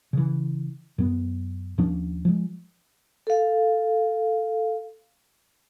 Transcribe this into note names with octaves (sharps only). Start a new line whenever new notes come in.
C#3 E3
F#2 B3
D#2 F3 C#4 D4
F3 G#3
A4 F5